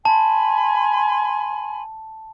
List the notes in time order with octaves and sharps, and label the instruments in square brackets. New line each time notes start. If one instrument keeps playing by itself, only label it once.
[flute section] G#5 B5 C6 [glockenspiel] A5